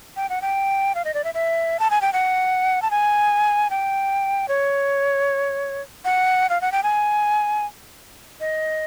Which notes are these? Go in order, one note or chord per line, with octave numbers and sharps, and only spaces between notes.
G5
F#5
G5
F5
D#5
D5
E5
E5
A5
G#5
G5
F#5
A5
G#5
G5
C#5
F#5
F5
F#5
G5
G#5
D#5